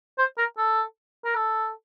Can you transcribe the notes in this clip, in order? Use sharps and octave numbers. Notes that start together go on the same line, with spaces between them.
C5
A#4
A4
A#4
A4